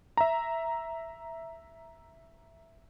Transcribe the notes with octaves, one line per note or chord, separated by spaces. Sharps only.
E5 A#5